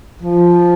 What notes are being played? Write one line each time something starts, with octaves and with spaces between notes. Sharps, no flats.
F3